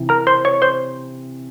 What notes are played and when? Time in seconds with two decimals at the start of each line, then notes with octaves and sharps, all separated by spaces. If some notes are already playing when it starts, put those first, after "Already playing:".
Already playing: C3 E3
0.09 A#4 A#5
0.27 C5 C6
0.45 C#5 C#6
0.62 C5 C6